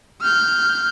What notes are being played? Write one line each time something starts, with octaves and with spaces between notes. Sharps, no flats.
F6 G6